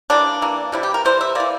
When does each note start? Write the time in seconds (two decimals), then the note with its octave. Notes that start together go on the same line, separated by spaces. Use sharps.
0.10 E3 G3 A#3 D4
0.42 E3 G3 A#3
0.72 C3 E3 G3 E4
0.83 G4
0.94 A#4
1.05 C3 E3 G3 C5
1.21 E5
1.35 E3 A#3 D5